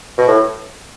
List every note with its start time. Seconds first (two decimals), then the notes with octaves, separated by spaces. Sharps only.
0.18 B2
0.28 A2